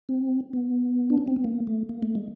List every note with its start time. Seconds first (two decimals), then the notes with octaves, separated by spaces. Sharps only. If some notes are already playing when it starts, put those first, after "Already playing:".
0.09 C4
0.53 B3
1.10 D4
1.18 C#4
1.28 C4
1.36 B3
1.44 A#3
1.67 A3
1.89 A#3
2.03 A3
2.15 G#3